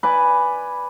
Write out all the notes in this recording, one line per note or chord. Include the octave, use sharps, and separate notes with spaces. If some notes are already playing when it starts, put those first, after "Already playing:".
B4 D5 G#5